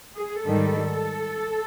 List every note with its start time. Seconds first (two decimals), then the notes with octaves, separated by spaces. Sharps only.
0.16 G#4
0.44 G#2 D#3 G3 A4